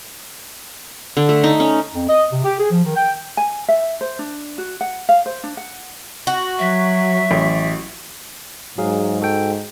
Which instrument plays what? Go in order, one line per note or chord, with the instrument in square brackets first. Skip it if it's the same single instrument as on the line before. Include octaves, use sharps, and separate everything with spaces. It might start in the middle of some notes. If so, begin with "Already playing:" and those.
[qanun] D3
A3
D#4
C#4
[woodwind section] F2
D#5
C3
G4
G#4
F3
D#3
G5
[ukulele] G#5
E5
C5
D4
F#4
F#5
F5
C5
D4
F#5
[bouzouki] F#4
[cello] F#3 [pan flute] E5
[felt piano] A1
[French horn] G#2 [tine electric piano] F#3 G#4 F5
[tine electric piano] F#4 A4 G5